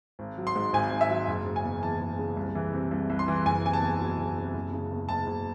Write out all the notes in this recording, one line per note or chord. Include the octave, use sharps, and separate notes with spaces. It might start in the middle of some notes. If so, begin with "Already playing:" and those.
G#1
F#3
C6
G#2
G#1 G#5
G#1
E5
F#3
F#1
C#3
G#5
E2
E3 A5
F#1
C#3
C2
E3
C3
C2
C2
C6
E3
F#1 G#5
C3 G#5
A5
E2
F#3
F#1
C3
F#1
C#3
E2
F#1 A5
F#1